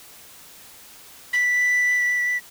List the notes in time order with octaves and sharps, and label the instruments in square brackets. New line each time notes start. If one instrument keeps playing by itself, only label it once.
[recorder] B6